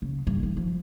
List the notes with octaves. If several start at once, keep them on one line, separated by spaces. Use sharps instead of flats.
C#3
G2
D#3
F3